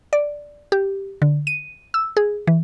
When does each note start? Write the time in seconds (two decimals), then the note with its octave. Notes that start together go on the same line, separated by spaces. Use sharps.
0.13 D5
0.72 G4
1.22 D3
1.47 D#7
1.94 E6
2.17 G#4
2.47 E3